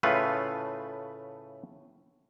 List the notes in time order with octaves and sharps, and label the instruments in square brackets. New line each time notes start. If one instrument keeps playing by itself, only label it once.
[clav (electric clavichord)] A2 C#3 A3 F4 B4